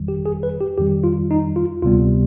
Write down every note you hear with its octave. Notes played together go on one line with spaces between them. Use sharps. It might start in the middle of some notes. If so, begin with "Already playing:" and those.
Already playing: G1 F2 D#3 G3
G4
G#4
B4
G4
F2 D#3 G3 G4
F4
D#4
F4
D2 C3 G3 B3 F4